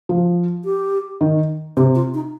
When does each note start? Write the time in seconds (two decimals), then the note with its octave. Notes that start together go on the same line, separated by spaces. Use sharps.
0.09 F3
0.65 G4
1.21 D#3
1.77 C3 G4
1.95 F4
2.14 D#4